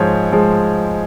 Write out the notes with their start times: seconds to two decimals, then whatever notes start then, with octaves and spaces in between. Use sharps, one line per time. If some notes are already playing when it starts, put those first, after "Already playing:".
Already playing: G#2 F3 G#3 C#5
0.31 G#2 F3 G#3